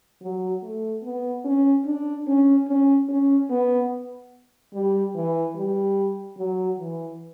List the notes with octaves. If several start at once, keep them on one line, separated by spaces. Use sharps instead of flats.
F#3
A3
B3
C#4
D4
C#4
C#4
C#4
B3
G3
E3
G3
F#3
E3